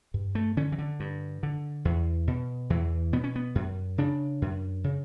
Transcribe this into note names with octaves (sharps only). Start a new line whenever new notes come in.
G2
A3
D3 C#4
E3
D3
G2
D3
E2
B2
E2 E3
B2 B3
C#4
B3
F#2
C#3 D4
F#2
C#3